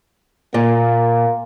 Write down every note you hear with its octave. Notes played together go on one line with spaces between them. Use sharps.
A#2 A#3